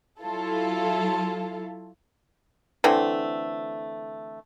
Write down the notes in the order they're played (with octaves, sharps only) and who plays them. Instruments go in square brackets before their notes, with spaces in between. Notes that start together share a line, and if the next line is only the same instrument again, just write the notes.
[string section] F#3 E4 F4 A4
[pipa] D3 E3 A3 C4